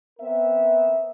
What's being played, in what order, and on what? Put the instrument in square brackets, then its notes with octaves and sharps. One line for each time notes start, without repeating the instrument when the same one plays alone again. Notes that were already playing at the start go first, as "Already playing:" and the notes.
[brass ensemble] B3 C4 A#4 E5